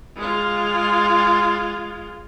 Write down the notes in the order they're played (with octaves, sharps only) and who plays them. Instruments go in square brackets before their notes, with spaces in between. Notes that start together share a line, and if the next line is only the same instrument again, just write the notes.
[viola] G#3 F4